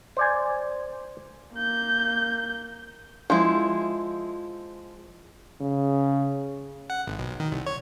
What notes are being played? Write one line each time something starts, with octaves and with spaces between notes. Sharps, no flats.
C5 D5 G#5
A#3 G6
F3 G#3 E4
C#3
F#5
G#1
B1
D#3
C2
C#5